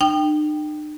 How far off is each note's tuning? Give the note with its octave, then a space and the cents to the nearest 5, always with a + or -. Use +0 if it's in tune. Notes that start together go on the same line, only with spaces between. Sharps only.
D#4 -45 G5 +0